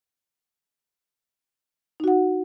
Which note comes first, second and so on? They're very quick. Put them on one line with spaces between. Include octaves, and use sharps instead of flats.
D#4 F#4 F#5